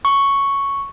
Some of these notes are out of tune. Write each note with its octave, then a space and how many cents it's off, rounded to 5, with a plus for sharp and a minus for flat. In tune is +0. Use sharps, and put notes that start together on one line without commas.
C#6 +0